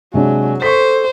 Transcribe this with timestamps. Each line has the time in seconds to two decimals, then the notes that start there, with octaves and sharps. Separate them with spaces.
0.14 C3 F#3 G#3 D4 G#5
0.62 A4 C5 C#6 B6